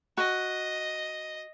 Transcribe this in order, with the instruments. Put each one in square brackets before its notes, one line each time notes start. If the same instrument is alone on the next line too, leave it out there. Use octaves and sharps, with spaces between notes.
[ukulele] F#4 [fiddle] D#5